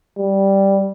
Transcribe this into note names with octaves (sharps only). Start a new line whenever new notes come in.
G3